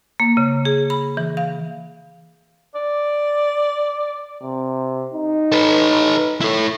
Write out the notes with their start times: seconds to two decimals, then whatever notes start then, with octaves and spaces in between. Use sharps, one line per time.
0.20 A#3
0.37 C#3
0.65 G#4
0.90 B5
1.17 E3
1.37 F5
2.75 D5
4.43 C3
5.14 D#4
5.52 A4 B4
6.41 E4 A4